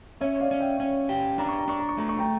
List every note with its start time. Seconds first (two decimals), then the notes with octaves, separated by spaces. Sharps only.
0.21 C#4 C#5 E5
0.40 D5 F5
0.51 C#4
0.60 E5 G5
0.80 C#4
1.09 G4
1.38 D4 A#5
1.49 C#6
1.59 A#5
1.68 D4 C#6
1.79 A#5
1.89 C#6
1.97 A3 A#5
2.09 C#6
2.19 G5 A#5